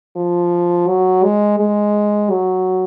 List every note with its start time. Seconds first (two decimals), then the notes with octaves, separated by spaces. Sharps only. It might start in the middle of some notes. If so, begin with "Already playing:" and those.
0.16 F3
0.88 F#3
1.24 G#3
1.60 G#3
2.31 F#3